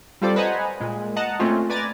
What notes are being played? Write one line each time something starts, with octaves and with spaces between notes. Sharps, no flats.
G3 C4 F4 A4 C5 D5
B4 C5 D#5 F#5 G#5 A#5
A#2 G#3
D#5 F#5 A5 A#5
A#2 A3 C4 C#4 F4
B4 D5 G#5 A#5 A6